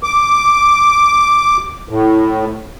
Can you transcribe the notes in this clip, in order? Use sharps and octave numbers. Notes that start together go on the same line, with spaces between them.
D6
A2